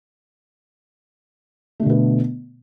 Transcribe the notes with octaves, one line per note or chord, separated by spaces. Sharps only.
B2 D3 A3 B3